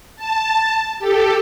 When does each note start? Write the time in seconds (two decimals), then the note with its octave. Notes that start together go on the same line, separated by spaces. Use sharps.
0.16 A5
0.99 G4 A4